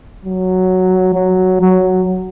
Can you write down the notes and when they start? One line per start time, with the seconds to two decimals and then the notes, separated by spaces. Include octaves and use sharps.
0.25 F#3
1.15 F#3
1.61 F#3